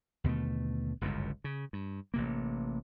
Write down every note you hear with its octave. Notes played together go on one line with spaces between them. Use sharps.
D#2 B2 D3 A3
G1 C#2 F#2 A2
C#3
G2
A1 C3 A#3